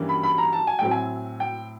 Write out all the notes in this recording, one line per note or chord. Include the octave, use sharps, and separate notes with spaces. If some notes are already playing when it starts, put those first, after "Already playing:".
Already playing: G2 E3 G3 A#3 C#4
B5
B5
A#5
A5
G#5
A2 F#3 A3 C4 G5
G#5
G5